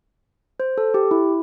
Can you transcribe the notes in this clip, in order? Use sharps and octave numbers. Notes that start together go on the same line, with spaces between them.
C5
A4
G4
E4